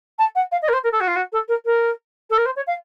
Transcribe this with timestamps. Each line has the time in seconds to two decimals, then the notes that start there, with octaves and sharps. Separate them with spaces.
0.18 A5
0.35 F#5
0.51 F5
0.62 D#5
0.68 A#4
0.73 C5
0.83 A#4
0.92 A4
1.00 F#4
1.07 F4
1.16 F#4
1.32 A4
1.48 A#4
1.65 A#4
2.30 A4
2.37 A#4
2.45 C5
2.56 C#5
2.67 F5